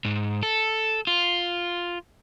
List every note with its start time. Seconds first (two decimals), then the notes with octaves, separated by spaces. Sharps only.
0.05 G#2
0.43 A4
1.07 F4